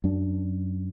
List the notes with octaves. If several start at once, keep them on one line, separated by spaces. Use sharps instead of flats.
F#2 D4